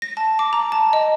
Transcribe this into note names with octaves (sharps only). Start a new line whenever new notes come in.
A#6
A5
D6
A#5
A5
D#5